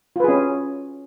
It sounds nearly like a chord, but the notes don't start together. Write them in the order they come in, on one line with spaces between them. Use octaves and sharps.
F4 B4 G#4 C#4